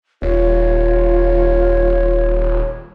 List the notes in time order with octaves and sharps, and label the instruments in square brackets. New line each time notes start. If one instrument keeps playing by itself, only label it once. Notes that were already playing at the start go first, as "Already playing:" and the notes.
[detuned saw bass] D#1 [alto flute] F4 [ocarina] C#5